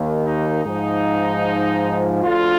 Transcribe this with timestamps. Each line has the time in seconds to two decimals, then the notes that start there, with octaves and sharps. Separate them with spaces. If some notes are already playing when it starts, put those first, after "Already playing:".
Already playing: D#2 D#3
0.25 D#4
0.64 G#2 F3 D#4
2.23 D2 D3 F3 F4